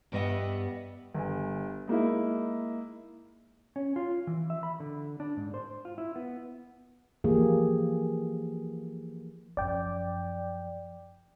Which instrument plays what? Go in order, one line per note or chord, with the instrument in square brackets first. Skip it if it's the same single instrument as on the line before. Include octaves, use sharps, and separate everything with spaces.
[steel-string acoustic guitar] G2 G3 B3 D#5 E5 F#5
[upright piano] G1 G#5
G#3 A#3 D#4 E4
[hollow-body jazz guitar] C#4
F4
E3
E5
B5
D3
D4
G#2
C5
F4
E4
B3
[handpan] E3 F3 A#3 G4 G#4
[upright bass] F#2 F3 [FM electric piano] D5 G5